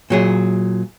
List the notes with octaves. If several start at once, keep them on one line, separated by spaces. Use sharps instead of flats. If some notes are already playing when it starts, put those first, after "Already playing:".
A#2 F#3 G#4